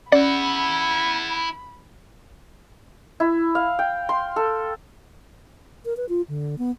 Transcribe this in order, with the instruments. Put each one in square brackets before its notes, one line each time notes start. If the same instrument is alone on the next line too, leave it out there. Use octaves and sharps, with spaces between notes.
[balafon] C#4 [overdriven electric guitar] E4 F#5 [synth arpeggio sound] D5 [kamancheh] B5
[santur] E4
F5
G5
C6
A4
[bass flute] A#4
B4
F4
D3
B3